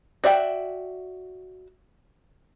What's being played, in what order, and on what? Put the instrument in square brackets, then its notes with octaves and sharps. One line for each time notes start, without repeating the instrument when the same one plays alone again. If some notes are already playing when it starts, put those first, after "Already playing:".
[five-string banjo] F#4 D5 E5 F#5 G5